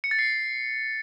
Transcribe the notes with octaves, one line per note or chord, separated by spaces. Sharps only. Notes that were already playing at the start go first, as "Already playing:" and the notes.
C#7
A6
C7